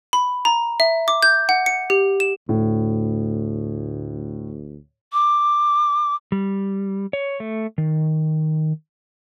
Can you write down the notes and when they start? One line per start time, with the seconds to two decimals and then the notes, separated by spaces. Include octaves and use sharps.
0.13 B5
0.45 A#5
0.80 E5
1.08 D6
1.23 G6
1.49 F#5
1.66 C#7
1.90 G4
2.20 E7
2.49 D2 A2
5.13 D6
6.32 G3
7.13 C#5
7.40 A3
7.78 D#3